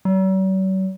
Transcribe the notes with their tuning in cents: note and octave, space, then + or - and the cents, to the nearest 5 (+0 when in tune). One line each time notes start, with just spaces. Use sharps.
F#3 +45